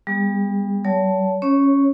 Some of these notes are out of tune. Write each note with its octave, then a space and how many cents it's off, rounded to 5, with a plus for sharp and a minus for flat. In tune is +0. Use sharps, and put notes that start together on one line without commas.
G3 +30 B3 +0 G#4 -45
G3 -45 C#5 +40 A5 +0
C#4 +0 C#5 -10